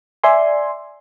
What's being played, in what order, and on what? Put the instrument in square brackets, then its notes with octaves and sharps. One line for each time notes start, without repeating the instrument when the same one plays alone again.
[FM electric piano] D5 E5 G#5 C6